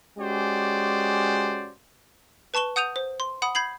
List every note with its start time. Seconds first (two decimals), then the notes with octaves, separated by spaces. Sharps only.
0.18 G#3 C#4 F#4 G4 C5 D5
2.54 B4 A5 C#6 E7 G7
2.76 F#5 D#6 G6 D#7 F7
2.96 C5
3.20 C6
3.42 F#5 B5 D#6
3.55 B5 G6 G#6 C7 F#7